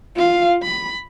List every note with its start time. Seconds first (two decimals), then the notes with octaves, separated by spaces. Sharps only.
0.16 F4 F5
0.62 B5